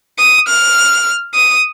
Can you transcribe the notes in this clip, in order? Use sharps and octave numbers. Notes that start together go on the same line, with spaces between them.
D#6
F6
D#6